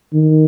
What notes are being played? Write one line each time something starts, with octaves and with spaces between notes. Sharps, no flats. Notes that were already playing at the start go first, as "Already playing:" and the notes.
D#3